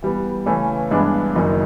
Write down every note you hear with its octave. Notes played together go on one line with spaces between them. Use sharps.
E3 G3 B3
C#3 E3 A3 C#4
G2 E3 G#3 B3 D4
F#1 F#2 D#3